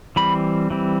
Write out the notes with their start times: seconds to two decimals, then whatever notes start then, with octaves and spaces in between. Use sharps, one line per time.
0.16 E3 G3 C4 B5
0.70 E3 G3 C4